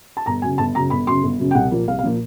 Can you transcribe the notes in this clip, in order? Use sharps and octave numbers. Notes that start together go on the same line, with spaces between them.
A5
G1 A#5
F#2 C#3 G#5
G1 A5
F#2 C#3 A#5
G1 B5
F#2 C#3 C6
G1
F#2 C#3
G5
C2 F#5
A#2 F3 A#3
C2 F5
F5
A#2 F3 A#3